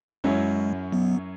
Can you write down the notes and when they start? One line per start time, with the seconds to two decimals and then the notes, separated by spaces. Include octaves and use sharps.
0.24 F#2 F#3 G#3 C#4 E4 C#5
0.92 F#3 B3